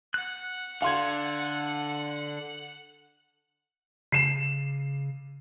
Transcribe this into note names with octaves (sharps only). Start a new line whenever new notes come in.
F#5 F#6
D3 F5 C6 G#6
C#3 C7 E7